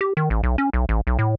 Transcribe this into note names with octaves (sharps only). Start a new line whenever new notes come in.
G4
D#3
A1
B1
C#4
B1
A1
B1
A2